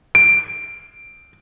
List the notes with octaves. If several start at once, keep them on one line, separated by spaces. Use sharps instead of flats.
D7